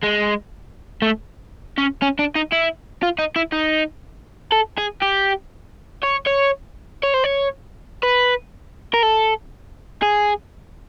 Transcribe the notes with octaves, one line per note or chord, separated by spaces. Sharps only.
G#3
A3
C#4
C#4
D4
D#4
E4
F4
D#4
E4
D#4
A4
G#4
G4
C#5
C#5
C#5
C5
C#5
B4
A#4
A4
G#4